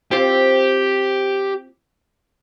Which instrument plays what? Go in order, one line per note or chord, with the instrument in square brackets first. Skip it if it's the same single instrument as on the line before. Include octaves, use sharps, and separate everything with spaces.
[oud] C4 F4 [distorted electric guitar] G4